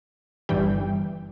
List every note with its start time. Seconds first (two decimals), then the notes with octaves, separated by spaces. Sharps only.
0.49 G1 G2 E3 G3 G5